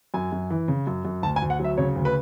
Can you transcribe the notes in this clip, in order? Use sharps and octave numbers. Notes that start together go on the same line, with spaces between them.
F#2 G#5
F#2
E3
C#3
F#2
F#2
D2 A5
G#5
D2
F#5
F#3 E5
C#3 C#5
D2
B4